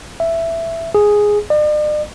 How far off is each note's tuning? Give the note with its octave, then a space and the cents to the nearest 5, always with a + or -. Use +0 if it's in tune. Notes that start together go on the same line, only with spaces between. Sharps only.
E5 +10
G#4 +0
D5 +45